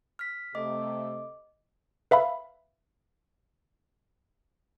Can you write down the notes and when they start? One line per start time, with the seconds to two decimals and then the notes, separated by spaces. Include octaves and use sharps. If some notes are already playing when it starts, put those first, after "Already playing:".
0.19 F6 B6
0.55 C3 A3 D#5 D6
2.11 B4 E5 F5 B5